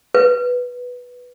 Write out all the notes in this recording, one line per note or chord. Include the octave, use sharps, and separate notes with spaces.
B4